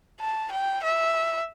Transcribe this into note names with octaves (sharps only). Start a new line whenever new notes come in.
A5
G5
E5